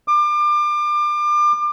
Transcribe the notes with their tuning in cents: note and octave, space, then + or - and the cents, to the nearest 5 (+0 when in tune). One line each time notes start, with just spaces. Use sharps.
D6 +30